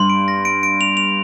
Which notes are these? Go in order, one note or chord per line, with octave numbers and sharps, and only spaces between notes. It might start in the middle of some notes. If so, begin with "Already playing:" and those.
Already playing: G2 C6
D7
A#6
D7
D7
F7
F7